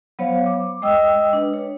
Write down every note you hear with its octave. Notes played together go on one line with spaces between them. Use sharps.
F#3 B3 C5 C#5 F5
D6
G#3 D#5 G5 D#6 E6
D4 B4
C#5